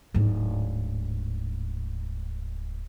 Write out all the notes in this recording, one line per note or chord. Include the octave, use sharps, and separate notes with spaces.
D1 G#2